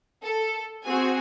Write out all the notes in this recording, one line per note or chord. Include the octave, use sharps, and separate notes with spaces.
A4
C4 F#4 G#4 G#5